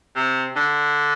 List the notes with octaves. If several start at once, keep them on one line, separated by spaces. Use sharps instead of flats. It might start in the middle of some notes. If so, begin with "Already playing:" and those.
C3
D3